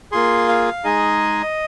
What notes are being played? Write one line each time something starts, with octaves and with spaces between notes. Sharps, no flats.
A#3 F4 G#4 C6
F5
G#3 D#4 G#4 D#5